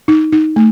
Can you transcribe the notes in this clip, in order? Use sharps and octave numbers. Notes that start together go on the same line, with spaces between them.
D#4
D#4
A3